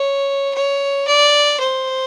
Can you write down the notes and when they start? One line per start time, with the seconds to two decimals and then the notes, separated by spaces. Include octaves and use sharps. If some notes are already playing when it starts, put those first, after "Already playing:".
Already playing: C#5
0.54 C#5
1.07 D5
1.60 C5